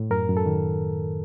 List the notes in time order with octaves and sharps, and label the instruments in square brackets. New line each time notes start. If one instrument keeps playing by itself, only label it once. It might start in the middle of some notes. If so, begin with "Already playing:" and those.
Already playing: [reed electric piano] A2
F#2 A#4
F#2
A4
D#3